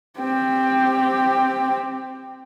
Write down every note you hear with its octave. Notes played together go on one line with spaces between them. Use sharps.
C4 G4